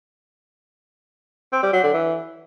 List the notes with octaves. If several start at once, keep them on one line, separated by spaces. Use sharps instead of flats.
C4
G3
F#3
D3
E3